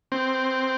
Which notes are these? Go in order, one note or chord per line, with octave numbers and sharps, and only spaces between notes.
C4